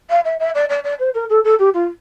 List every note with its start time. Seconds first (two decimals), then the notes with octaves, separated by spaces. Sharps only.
0.10 F5
0.25 E5
0.40 E5
0.55 D5
0.69 D5
0.84 D5
0.99 C5
1.14 A#4
1.30 A4
1.44 A4
1.59 G4
1.74 F4